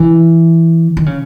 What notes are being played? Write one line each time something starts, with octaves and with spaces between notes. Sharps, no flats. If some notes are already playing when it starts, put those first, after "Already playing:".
Already playing: E3
D#3
C#3